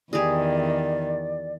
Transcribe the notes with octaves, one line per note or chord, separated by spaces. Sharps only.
E2 D#3 G4 G#4 D5